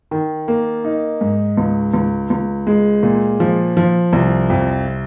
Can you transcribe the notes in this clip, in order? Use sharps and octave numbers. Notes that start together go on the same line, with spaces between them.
D#3
A#3
D#4
G#2
C#2
C#2
C#2
G#3
A#2
F3
F3
C2
F2